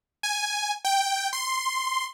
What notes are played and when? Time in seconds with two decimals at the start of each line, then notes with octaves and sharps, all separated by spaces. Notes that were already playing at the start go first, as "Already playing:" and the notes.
0.23 G#5
0.85 G5
1.33 C6